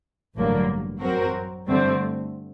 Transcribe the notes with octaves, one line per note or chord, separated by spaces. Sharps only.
A1 G2 D3 F#3 A#3
F#2 F#3 C4 F#4 A#4
G2 D3 A3 C4